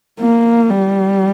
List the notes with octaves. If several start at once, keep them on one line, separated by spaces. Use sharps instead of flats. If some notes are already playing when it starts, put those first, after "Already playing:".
A#3
G3